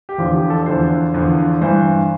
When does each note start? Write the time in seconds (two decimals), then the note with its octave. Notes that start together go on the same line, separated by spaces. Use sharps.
0.09 G4
0.18 E2 D3 F3 F4
0.35 G4
0.50 A4
0.66 E2 D3 F3 C5
1.14 E2 D3 F3
1.61 G2 E3 C5